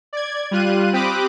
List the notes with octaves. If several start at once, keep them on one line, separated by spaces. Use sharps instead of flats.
D5 G#6
G3 F4 F#6 D#7
C4 G4 B5 D6 D#6 F#6